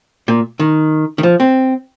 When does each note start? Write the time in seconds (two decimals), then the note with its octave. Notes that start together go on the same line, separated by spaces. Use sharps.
0.28 A#2
0.60 D#3
1.18 D#3
1.23 F3
1.40 C4